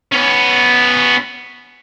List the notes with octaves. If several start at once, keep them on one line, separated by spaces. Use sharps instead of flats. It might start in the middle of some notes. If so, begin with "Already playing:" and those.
B3 C#4